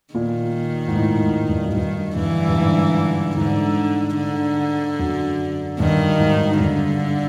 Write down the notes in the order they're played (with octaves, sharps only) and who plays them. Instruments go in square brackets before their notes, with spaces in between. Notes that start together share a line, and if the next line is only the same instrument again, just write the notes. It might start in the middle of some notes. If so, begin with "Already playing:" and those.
[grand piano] A#2 [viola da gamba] D#3
[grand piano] G#2
A2
G#2
G2
F#2
[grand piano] G2 [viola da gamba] D#3
[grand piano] G2 [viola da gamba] D3 E3
[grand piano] G2
G#2
[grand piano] G#2 [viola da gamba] D3
[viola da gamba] D3
[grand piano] F#2
[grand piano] G2 [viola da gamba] D#3
[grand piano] G#2
[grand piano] G2 [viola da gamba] D3